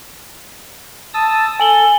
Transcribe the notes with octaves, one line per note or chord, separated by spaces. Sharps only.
A5 D#6 E6
A4 G#5 F#7 G7